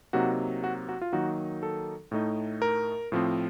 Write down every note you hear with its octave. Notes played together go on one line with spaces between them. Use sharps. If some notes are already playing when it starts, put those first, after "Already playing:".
C3 F#3 A#3 D#4 F#4
F#4
F#4
F4
D#3 F#3 A#3 D#4 F#4
A4
A2 A3 D#4
A#4
A2 F3 C4